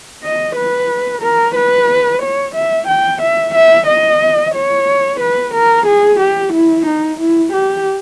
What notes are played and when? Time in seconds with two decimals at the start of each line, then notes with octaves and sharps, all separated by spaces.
0.24 D#5
0.56 B4
1.22 A#4
1.56 B4
2.23 C#5
2.56 E5
2.88 G5
3.22 E5
3.55 E5
3.88 D#5
4.55 C#5
5.20 B4
5.55 A#4
5.87 G#4
6.20 G4
6.53 E4
6.87 D#4
7.20 E4
7.53 G4